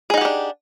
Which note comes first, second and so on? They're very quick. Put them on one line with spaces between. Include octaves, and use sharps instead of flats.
G#4 D#4 F#5 G4 D4